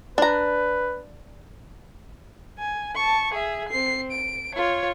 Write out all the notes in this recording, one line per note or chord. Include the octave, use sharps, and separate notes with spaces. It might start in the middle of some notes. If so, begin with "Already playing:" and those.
D4 B4 A#5
G#5
A5 C#6
G#4 E5
C4 C7
D7
F4 C#5